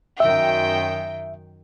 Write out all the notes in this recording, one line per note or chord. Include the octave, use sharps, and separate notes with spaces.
F#2 D#3 E5 G5